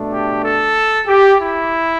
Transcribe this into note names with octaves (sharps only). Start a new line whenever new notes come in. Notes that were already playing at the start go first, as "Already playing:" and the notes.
Already playing: B2 A3 D4
G4
A4
G4
E4